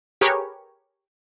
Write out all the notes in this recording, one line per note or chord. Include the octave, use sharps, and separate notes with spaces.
G4 G#4 A#4 B4 C#5